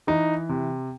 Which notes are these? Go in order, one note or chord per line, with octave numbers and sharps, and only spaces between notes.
E3 D#4
C3